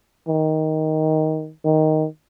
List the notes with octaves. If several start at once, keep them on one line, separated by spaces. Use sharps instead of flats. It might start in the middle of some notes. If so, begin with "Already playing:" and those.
D#3
D#3